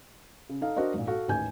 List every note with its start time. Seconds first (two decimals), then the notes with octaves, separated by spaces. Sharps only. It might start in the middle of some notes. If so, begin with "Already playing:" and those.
0.49 C#3
0.62 D#4 A4 F5
0.76 D4 F#4 A#4 C5 D#5
0.94 G#1 A#2
1.07 F#4 A4 F5
1.28 A1 D#2 G#5 G6